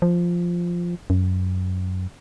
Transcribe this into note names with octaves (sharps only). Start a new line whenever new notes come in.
F3
F#2